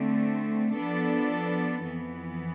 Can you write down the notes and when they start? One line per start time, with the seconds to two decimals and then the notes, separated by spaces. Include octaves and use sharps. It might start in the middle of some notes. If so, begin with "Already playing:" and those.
Already playing: D3 A3 C4
0.75 F3 B3 D4 A4
1.85 F2 E3 B3